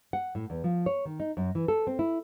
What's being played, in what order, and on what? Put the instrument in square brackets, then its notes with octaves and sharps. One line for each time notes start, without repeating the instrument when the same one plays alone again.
[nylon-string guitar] F#5
A2
E2
F3
C#5
D#3
D#4
F#2
E3
A4
C4
E4